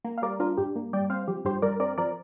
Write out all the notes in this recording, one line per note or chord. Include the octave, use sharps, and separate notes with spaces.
A#3
F5
G3 A#4 D5
D4 F4 A#4
G2 G4
A#3
G3 D5 G5
C4 C5 F5
F3 G4
G2 G4 C5
G2 A#4 D5
C4 A#4 D5
F3 A#4 D5